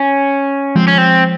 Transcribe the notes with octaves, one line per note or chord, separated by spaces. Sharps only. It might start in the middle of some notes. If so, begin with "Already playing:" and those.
Already playing: C#4
F3 G#3 C4
C#4
C4